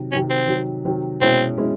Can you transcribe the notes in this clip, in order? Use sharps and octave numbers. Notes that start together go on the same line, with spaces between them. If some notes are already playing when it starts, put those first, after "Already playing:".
Already playing: C3 D#3 F#3
C3 D#3 F#3 C#4
C4
C3 D#3 F#3
C3 D#3 F#3
B2 G#3 C4 C#4 E4
B2 G#3 C#4 E4